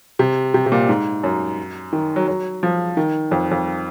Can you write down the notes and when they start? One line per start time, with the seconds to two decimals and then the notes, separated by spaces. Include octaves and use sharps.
0.19 C3
0.54 C3
0.66 C3
0.72 A#2
0.89 G#2
1.24 F#2
1.93 D#3
2.16 F#3
2.28 F#3
2.63 F3
2.97 D#3
3.31 F2
3.51 F2